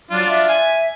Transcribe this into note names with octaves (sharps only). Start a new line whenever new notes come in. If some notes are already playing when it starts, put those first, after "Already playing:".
F#3 D4 F4
E5
G#5